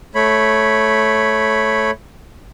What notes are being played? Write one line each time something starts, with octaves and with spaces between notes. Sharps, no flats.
A3 C#5 B5